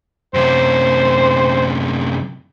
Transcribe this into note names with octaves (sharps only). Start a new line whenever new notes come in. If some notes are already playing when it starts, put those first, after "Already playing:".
F#2 C3 C5